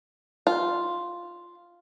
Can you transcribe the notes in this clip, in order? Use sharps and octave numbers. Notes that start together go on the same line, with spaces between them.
F4